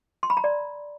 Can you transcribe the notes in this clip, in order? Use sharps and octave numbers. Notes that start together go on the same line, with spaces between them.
C6
B5
A#5
D5